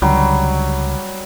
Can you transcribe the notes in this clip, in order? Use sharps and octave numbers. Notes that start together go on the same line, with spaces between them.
C#2 D3 F#3 G3